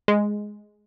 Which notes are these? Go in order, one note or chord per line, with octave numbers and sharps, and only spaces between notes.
G#3